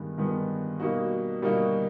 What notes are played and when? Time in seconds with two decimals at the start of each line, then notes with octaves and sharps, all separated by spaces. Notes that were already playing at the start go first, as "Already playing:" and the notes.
Already playing: G2 D#3 G#3 B3
0.18 G2 D#3 G#3 B3
0.80 B2 G3 A#3 D#4 F#4
1.42 B2 G3 A#3 D#4 F#4